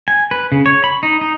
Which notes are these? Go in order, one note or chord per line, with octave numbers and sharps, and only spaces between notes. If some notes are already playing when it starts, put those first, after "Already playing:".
G#5
B4
C#3
C#5
B5
D#4
D#4